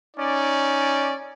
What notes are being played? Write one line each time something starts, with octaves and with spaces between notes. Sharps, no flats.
C#4 D#4 D5